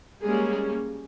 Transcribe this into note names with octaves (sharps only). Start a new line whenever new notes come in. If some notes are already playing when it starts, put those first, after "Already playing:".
G3 G#3 A#3 C#4 G#4